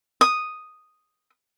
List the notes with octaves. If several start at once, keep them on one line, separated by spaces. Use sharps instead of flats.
D#6